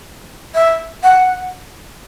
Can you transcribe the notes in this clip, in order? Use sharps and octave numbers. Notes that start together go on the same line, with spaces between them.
E5
F#5